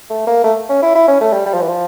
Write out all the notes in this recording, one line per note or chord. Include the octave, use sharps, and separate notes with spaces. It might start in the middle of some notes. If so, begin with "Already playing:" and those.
A3
A#3
A3
C#4
E4
E4
C#4
A3
G3
G3
F3
E3
F3